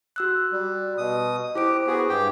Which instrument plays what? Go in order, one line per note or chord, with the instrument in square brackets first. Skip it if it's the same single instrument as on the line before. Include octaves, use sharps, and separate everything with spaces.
[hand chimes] F#4 E6 F#6
[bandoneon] G3
B2 D#6
[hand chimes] E4 C5 D7 [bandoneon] G4
[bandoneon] B3 F#4 G#4
G2 G4 G5